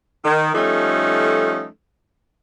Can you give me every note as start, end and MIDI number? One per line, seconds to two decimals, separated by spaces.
0.25 0.49 51
0.55 1.67 53
0.55 1.67 55
0.55 1.67 57
0.55 1.67 61
0.55 1.67 63
0.55 1.67 69